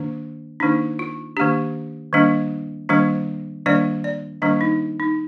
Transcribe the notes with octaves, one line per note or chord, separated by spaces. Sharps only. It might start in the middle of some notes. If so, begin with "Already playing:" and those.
Already playing: D#3 A#3 D4
D#3 A#3 D4 D#4
F4
D#3 A#3 D4 G4
D#3 G3 A#3 D4
D#3 G3 A#3 D4 C5
D#3 G3 A#3 D4 D5
D5
D#3 G3 A#3 D4
D#4
D#4